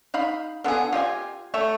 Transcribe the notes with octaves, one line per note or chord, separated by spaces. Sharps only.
D#4 F5 B5
D3 B3 F4 G#4
F4 G4 D#5 G#5
A3 C#5 E5